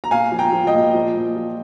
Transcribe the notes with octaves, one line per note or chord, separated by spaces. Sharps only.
A#5
A#2 F5 G#5
F3
G5 A#5
F3
D#5 G5
A#2
F3
A#2
F3